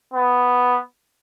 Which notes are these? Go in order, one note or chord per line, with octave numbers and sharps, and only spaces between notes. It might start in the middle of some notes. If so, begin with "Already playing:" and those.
B3